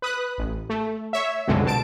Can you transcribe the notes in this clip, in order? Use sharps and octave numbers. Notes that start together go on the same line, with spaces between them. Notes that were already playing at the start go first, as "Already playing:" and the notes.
B4 D#6 F#6
A1
A3
C#5 E5
C2 F2 B2 D3 F#3 G#3
B2 A5 D7